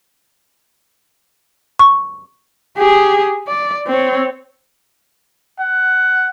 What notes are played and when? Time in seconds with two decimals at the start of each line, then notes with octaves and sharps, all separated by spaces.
1.79 C#6
2.78 G4 G#4
3.48 D5
3.88 C4 C#5
5.60 F#5